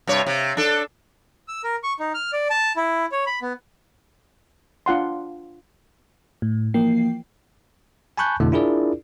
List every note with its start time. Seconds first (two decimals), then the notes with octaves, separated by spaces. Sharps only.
0.07 G2 C3 C#5
0.26 C3
0.57 D4 A4
1.48 E6
1.64 A#4
1.83 C#6
2.00 D#4
2.14 F6
2.33 D5
2.50 A5
2.76 E4
3.12 C#5
3.26 B5
3.42 B3
4.86 D4 F4 F#5 C6
6.42 A2
6.74 E3 F3 A#3 G5 C7
8.17 G#5 A5 B5 C#6 F#6 G6
8.40 F2 B2 D3 A3 E4
8.52 D4 E4 F4 G#4 A#4 D5